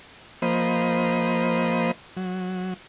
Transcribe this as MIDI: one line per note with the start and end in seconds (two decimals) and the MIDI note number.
0.42 1.91 53
0.42 1.91 58
0.42 1.91 72
0.42 1.91 75
0.42 1.91 83
2.17 2.74 54